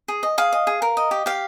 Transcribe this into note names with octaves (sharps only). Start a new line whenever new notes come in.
G#4
D#5
G#4 F5
D#5
G#4
A#4
D#5
G4
G4 F5